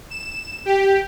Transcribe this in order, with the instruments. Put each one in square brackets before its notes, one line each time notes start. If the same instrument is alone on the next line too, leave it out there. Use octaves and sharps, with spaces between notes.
[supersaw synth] E7
G4